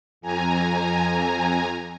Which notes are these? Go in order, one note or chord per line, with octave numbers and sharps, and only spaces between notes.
F2 G#5 A#5